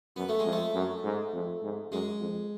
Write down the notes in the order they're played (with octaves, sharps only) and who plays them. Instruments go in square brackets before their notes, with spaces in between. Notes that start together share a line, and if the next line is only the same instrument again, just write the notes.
[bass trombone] F#2 [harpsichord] B3
[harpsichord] A3
G#3
[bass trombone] F2
[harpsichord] A3
[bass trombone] F#2
G#2
F2
G#2
[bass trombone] F#2 [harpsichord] G#3
[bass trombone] F2